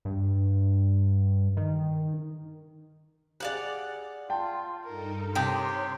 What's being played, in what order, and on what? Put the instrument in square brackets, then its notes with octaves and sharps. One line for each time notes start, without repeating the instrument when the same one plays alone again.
[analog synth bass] G2
D#3
[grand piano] G4 G#4 [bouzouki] D5 F5 F#5
[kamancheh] F4 [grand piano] G5 A5 C6
[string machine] G2 D#4 A4 [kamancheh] A#4
[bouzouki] C3 G4 [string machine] C#5 [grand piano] G5 A5 D#6 [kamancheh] C6